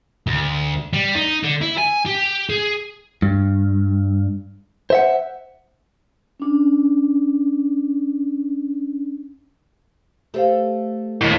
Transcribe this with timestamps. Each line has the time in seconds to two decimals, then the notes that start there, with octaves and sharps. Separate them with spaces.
0.27 D2
0.93 G3
1.15 D#4
1.44 D3
1.62 E4
1.78 G#5
2.06 G4
2.49 G#4
3.22 G2
4.90 C5 E5 F#5
6.40 C#4 D4
10.34 A3 G4 C5 F5
11.21 D#2 A2